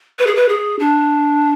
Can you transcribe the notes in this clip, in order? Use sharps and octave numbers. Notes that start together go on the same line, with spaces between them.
B4
G#4
B4
G#4
D4